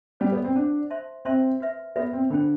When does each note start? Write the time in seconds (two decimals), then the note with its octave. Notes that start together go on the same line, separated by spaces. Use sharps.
0.20 G3 C5 F#5 A5
0.32 B3
0.44 C4
0.56 D4 C5 F#5 A5
0.90 C5 E5 A5 C6
1.25 C4 C5 E5 A5 C6
1.60 F#4 B4 E5
1.96 B3 F#4 B4 E5
2.13 C4
2.30 D3 C5 G5 B5